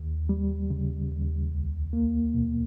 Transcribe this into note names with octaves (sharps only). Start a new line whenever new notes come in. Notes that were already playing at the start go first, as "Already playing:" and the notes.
Already playing: D#2
G3
C#3
D#2
C#2
A#3
B2